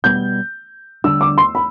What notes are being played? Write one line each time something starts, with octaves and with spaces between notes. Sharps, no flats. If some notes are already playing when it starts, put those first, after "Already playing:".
B2 G3 B3 G6
D3 G3 D4 E6
D6
C6
B5